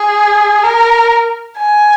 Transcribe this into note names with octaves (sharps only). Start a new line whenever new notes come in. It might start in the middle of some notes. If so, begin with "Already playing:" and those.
Already playing: G#4
A#4
G#5